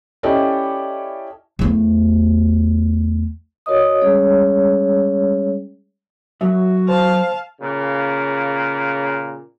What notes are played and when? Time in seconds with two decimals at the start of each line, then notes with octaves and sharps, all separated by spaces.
0.23 C#4 E4 G4 A4 D5 D#5
1.59 E2 A3
3.66 F#4 A#4 C#5 D#5 D#6
4.01 G3 G#3 C#4 G#4 C#5
6.41 F#2 F#3 F#4 E5
6.88 C5 F5 A5
7.61 A#2 C#3